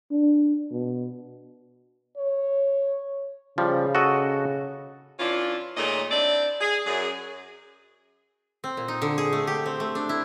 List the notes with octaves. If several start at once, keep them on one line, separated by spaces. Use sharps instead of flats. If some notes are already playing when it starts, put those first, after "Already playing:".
D4
B2
C#5
C#3 F3 G3
F#4 A4 D#5
E3 C#4 D4 E4 F4
A#2 D#3 G#3 A3 C#5 D#5
C4 D4 E4 D5
G#4
F#2 G#4
C4
A#2
D#4
D3
G#4
A3
G4
C4
A3
D4
E4